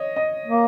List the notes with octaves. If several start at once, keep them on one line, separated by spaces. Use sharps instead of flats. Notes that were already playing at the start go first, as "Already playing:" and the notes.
Already playing: C#5 D#5
D#5
A#3